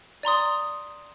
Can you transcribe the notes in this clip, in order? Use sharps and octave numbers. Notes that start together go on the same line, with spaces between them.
D5 A#5 C6 D#6